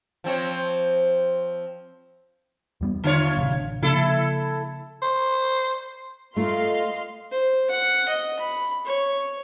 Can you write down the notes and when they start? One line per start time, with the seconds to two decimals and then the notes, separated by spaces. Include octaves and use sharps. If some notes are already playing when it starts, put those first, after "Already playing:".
0.24 F3 C4 C#5
2.81 E2 G3 B3
3.04 D3 F4 C#5
3.37 A1 C3
3.83 C#3 F3 A#3 E4 A4
5.02 C5
6.36 A3 F4 A#4 D#5 F5 C6
7.31 C5
7.71 F#5
8.09 D#5
8.39 B5
8.85 C#5